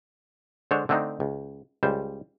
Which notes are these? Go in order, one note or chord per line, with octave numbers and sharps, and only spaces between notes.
D3 G#3 D4 C5 C#5
D3 A3 C4 D4 D#4
C#2
C#2 G3 C5